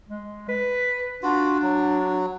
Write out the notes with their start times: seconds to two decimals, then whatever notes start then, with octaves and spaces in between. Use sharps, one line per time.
0.09 G#3
0.49 B4
1.23 D4 F4 F#4
1.62 F#3